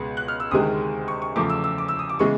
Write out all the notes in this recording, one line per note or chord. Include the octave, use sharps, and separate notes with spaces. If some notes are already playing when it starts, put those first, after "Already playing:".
Already playing: C#2 B2 G#3 B3
F#6
F6
E6
D2 C3 D#3 G#3 D#6
C#6
C#6
E2 C#3 F3 A3 D6
E6
E6
D6
E6
D#6
D6
C#3 E3 G#3 B3 C#6